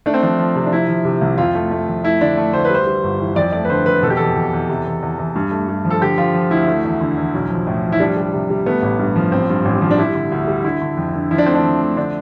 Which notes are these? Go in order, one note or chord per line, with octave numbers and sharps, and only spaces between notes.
A3 D4
C4
F3 D4
F3
C3
D4
F3 E4
F3
C3
C2
F2 F4
A3
A3
F2
A3 E4
D3 D4
A3
D2 C5
B4
G3 C5
G3
G1
E3
F2 D5
A3 D5
B4
D3 C5
F2 B4
B2 A4
G4
E2 A4
B2
E2
C3
E2
E2
E2
G2
A3
G2
F3
A4
D3 G4
F3 F4
F3
D2 E4
A3
E2
D3
E2
B1
F3
A2
F3
E4
G3 D4
G3
C3
G3
A3 B3
A1
G2
F3
A1 C4
G2
A1
F3
D4
G3 E4
D3
D2
G3
D3 E4
D3
F2
D3
F3 E4
D4
A3 C4
D4
F3
A3
D3 D4